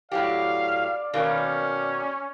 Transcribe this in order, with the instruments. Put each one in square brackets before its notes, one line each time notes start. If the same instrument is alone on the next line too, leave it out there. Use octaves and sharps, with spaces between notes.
[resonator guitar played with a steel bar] A2 F#3 G4 [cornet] D5 [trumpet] F5
[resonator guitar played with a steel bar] B2 D#3 A#3 [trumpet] C#4